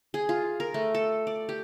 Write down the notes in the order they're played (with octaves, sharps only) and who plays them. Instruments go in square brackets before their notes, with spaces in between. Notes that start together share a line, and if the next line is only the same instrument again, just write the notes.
[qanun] G#4
F4
A#4
A3
A4
D5
G4